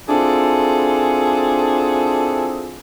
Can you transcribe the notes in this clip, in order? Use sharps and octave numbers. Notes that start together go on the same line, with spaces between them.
C4 D4 E4 F4 G#4 A4